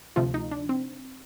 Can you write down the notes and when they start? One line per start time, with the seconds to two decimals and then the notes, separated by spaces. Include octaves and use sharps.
0.16 D2 C3 F3 A3 F4
0.34 D#4
0.51 D4
0.69 C4